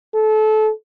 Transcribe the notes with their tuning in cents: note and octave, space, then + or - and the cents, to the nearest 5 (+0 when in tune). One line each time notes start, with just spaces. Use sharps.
A4 -25